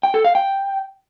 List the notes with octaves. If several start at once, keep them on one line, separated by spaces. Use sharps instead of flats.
G5
A4
F5
G5